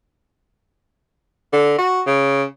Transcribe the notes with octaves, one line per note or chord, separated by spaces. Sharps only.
D3
F#4
C#3